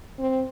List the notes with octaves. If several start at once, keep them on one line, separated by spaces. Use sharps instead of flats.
C4